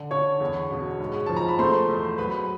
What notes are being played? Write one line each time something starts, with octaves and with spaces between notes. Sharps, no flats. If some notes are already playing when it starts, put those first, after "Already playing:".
Already playing: D3
D3 C#5 C#6
E2
B2
G#2
F3 A5
A#5
B5
A3 C5 C6
E2
F#3 B4 B5